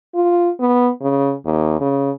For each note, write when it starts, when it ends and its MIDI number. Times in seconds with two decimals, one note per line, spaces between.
0.15 0.50 65
0.60 0.91 59
1.01 1.35 49
1.45 1.77 39
1.80 2.11 49